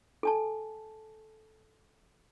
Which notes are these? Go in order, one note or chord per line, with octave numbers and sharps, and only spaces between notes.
A4 G#5 A5